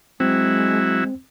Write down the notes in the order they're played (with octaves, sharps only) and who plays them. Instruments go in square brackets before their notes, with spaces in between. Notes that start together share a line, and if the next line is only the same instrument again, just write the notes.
[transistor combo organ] F#3 E4 [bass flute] G#3 [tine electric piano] C4